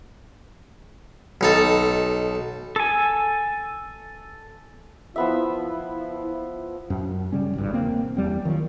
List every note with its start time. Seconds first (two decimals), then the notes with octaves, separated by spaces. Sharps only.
1.41 B1 D#4 A4
2.76 A4 G#5
5.16 F3 B3 E4 E5
6.90 F#2
7.32 C#3 G3 C#4
7.56 G#1 C#2 G2
7.73 E1 A#3 C4
8.17 E2 G3 C4
8.45 D#3 F3 F#3